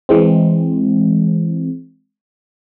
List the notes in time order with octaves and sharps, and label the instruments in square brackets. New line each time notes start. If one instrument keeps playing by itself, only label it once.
[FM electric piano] E3 G#3 C4